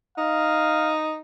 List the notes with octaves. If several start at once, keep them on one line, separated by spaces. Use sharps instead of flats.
D#4 F5